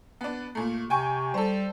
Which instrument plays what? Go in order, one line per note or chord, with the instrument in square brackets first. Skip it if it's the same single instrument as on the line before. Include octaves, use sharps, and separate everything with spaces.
[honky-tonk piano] B3 D4
A#2 A3
[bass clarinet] C3 [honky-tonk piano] G5 G#5 C#6
[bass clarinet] G3 [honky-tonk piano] A4 C5